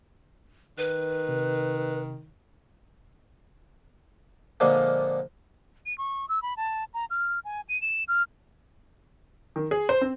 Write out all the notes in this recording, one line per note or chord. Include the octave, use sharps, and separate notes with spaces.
D#3 B4
C3
A#2 D3 F3 G#3 A#3
D#7
C#6
E6
B5
A5
A#5
F6
G#5
D#7
E7
F6
D#3
G#4
C5
C4